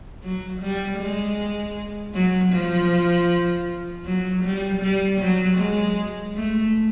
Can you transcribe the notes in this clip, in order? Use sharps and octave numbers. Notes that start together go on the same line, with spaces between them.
F#3
G3
G#3
F#3
F3
F#3
G3
G3
F#3
G#3
A3